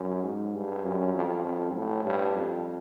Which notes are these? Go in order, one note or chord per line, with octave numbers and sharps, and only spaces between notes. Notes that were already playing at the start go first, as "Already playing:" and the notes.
Already playing: F#2
G#2
G2
F#2
F2
F2
A2
G2
F2